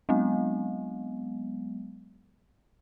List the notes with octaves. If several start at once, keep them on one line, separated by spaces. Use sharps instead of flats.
F#3 G#3 B3